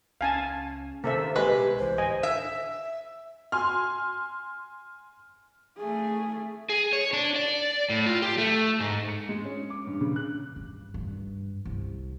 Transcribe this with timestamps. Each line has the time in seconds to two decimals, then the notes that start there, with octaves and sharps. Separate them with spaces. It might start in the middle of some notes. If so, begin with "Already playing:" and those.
0.21 C#2 C#4 F5 G#5 A5
1.04 C3 D#3 A#3 A4 C5 E5
1.36 A#1 B2 G#3 G4 B4
1.79 C2 E3 C5
1.98 D1 D#5 G#5
2.23 E5
3.52 G#5 C6 F6
5.78 A3 G#4
6.69 G#4
6.93 C#5
7.13 D4
7.36 D5
7.89 A2
8.06 F4
8.22 G4
8.38 A3
8.80 G#2
9.09 C#7
9.29 G#3
9.45 C#4
9.70 D6
9.87 G2
10.01 C#3
10.16 F#6
10.56 G2
10.94 G2
11.65 C2